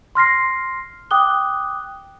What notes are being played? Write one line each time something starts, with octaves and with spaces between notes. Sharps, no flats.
C6 F6 A#6 C7
G5 D6 D#6 F#6 G7